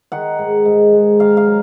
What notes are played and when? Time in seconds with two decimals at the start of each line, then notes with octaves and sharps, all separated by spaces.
0.12 D#3 F#5
0.39 G#2
0.65 G#2
0.92 G#3
1.20 D#3 F5
1.37 F5
1.46 F#3